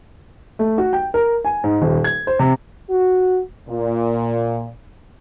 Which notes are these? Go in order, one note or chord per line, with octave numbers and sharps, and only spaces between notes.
A3
F#4
G5
A#4
G#5
G#2
D#1
G#6
C5
C3
F#4
A#2